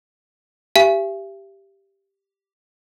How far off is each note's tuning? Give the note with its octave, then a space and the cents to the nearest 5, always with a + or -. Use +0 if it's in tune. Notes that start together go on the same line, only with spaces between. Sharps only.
G4 +0 E5 +40 G#5 +0